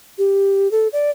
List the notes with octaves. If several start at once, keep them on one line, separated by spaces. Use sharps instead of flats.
G4
A4
D5